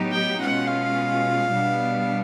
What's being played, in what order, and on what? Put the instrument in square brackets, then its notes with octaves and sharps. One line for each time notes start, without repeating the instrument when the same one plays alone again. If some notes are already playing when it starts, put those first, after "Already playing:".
Already playing: [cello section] A2 F#3 B3 D#4 G4
[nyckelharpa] G5
[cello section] B2 G#3 C#4 F4 [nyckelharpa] F#5
[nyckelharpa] F5
[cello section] B2 G3 B3 D4